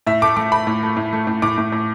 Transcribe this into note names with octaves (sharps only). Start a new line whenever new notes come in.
A2 E5
A3 D6
A3 D6
A3 B5
A2
A3
A2
A3
A2
A2 D6
A2
A2